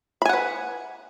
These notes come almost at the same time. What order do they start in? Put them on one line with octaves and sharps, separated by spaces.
B5 G#5 F#5 B4